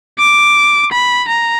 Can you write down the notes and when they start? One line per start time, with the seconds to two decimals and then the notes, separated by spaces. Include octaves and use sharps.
0.19 D6
0.92 B5
1.29 A#5